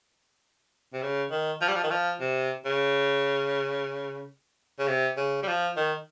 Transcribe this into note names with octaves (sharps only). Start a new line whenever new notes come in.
C3
C#3
D#3
F3
G3
F3
D#3
F3
C3
C#3
C#3
C3
C#3
G3
F3
D#3